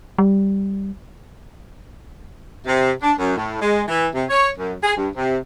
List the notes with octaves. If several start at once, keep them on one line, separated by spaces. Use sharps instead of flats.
G3
C3
D4
F#2
A2
G#3
E3
C3
C#5
F#2
G#4
G2
C3